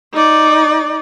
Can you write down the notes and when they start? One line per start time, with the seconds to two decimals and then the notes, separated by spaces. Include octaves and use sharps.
0.14 D#4 D5